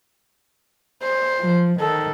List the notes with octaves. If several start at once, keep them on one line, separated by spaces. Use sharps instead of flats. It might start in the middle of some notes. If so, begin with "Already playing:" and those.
C5
F3
D#3 A4